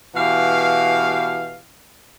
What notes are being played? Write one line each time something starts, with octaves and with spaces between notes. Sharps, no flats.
B2 E3 G4 F5